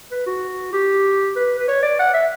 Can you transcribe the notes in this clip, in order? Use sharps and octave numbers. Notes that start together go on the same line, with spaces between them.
B4
F#4
G4
B4
B4
C#5
D5
F#5
E5